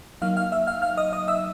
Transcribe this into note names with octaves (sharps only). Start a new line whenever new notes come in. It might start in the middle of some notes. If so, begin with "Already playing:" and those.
F#3 A#3 D#4 F5 F6
F5 F6
E5 E6
F5 F6
F5 F6
D#5 D#6
D#5 D#6
E5 E6